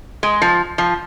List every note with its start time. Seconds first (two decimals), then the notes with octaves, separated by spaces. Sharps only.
0.23 G#3
0.42 F3
0.78 F3